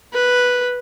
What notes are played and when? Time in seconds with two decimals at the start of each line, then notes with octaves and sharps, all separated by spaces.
0.14 B4